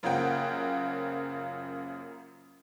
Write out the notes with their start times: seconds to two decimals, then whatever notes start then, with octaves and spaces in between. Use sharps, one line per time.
0.03 F#2 C#3 F3 A#3 F#5 G5